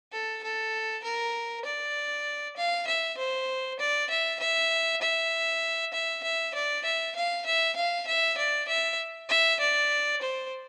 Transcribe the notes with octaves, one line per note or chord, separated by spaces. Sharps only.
A4
A4
A#4
D5
F5
E5
C5
D5
E5
E5
E5
E5
E5
D5
E5
F5
E5
F5
E5
D5
E5
E5
D5
C5